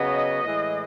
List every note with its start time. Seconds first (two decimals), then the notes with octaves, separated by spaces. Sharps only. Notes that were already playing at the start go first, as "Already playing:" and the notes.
Already playing: C#3 F#3 B3 D#5
0.43 A2 E3 G#3